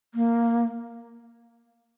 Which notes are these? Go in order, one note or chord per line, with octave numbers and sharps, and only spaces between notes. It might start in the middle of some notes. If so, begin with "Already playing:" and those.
A#3